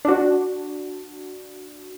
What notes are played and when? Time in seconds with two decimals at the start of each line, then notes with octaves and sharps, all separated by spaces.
0.05 D4 F#4